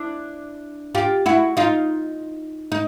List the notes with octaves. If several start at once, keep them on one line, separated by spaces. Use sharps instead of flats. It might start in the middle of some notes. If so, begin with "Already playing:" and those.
Already playing: D4 E4
F4 G4
E4 F#4
D#4 F4
D#4